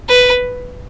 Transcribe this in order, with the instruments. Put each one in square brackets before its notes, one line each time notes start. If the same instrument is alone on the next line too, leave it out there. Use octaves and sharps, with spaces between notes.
[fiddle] B4